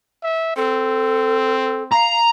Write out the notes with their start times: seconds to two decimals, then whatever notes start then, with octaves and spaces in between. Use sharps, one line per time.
0.23 E5
0.56 C4 A4
1.92 F5 A#5